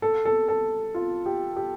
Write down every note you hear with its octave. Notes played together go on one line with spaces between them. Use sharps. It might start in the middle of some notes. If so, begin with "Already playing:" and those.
A4
A4
A4
F4
G4
G4